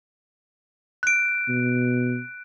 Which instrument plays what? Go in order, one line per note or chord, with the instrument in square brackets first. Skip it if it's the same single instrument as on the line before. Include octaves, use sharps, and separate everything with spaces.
[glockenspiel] F#6 D7
[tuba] B2